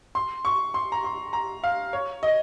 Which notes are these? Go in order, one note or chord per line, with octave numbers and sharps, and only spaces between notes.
C6
C#6
C6
A#5
C6
A#5
F5
C#5
D#5